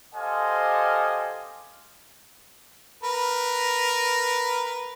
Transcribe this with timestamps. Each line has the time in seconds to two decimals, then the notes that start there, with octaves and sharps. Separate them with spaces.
0.14 G4 A4 C5 D#5 F5 G#5
3.03 A#4 B4